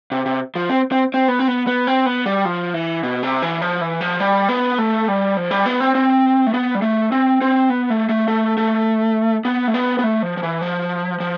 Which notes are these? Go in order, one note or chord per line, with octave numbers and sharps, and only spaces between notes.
C3
C3
F3
C4
C4
C4
B3
C4
B3
B3
C4
B3
G3
F3
E3
B2
C3
E3
F3
E3
F3
G3
B3
A3
G3
F3
G3
B3
C4
C4
A3
B3
G3
A3
C4
C4
B3
A3
A3
A3
A3
B3
A3
B3
B3
A3
F3
F3
E3
F3
F3